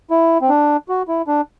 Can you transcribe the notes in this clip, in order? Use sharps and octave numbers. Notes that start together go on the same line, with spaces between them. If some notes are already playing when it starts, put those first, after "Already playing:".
E4
C4
D4
F#4
E4
D4